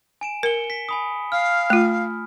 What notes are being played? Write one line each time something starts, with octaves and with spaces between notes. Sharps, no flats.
G#5 D7 E7
A#4 C#7 G7
B6
G#5 B5 D#6
F5 F6
A3 F4